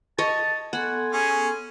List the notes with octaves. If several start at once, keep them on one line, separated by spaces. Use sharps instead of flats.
C#5 D#5 A5
B3 A4 F#5 G#5 C6
C#4 G#4 G#5